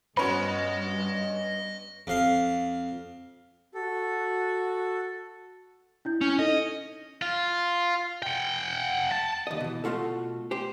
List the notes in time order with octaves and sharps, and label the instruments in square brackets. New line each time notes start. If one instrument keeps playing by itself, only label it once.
[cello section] G2 [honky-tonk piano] B3 C#4 F#4 [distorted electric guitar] D#5 C6 [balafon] B5
[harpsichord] F2 F5
[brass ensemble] F#4 [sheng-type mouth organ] A4
[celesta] D4 E4 G6
[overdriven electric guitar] C#4
[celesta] D#4 A4 [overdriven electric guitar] D#5
[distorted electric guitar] F4
F#5 G5
A5
[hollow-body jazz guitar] D#2 D#5
B2 E3
B2 A3 F4 F#4 A4
G4 C5